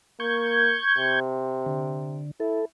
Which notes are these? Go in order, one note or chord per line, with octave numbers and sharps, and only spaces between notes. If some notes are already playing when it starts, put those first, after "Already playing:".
A#3 C#6 G6 G#6
C3
D3
E4 A4